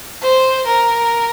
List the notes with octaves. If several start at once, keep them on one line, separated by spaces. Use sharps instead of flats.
C5
A#4